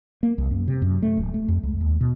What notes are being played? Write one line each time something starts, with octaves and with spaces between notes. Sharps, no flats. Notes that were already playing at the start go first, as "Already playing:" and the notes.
A#3
C2
F#2
C3
F#2
A3
D1
A3
F2
C#2
D#2
B2